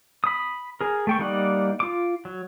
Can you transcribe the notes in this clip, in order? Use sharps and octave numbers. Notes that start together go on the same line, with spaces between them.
B5 D#6
G#4 A#4
A3 G5 C#6
G3 A#3 D#4 D5 F#5
F4 D6
F#3